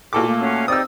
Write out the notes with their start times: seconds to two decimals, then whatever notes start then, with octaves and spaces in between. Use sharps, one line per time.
0.13 A#2 G#3 E4 F#4 A4 D6
0.26 A3 A#3
0.39 C#4 F#4 F5
0.68 C4 D#4 G4 D5 D#6 E6